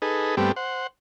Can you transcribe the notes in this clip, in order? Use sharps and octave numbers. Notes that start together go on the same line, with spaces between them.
D#4 G#4 A4 B4
G2 G3 A3 B3 C4 G4
C5 F#5